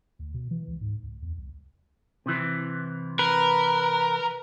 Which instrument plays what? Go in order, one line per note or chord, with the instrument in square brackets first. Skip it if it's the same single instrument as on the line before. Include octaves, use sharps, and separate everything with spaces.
[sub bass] D2
B2
E3
C#2
G#2
C#2
E2
C2
[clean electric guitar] C3 E3
[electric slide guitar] A#4 [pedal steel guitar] B4